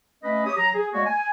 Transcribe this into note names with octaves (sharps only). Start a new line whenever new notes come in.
A3 C#4 B4 D#5
G4 C#5 D#6
F#3 A#5
G#4
G#3 A#3 F#4 C#5 D5
G#5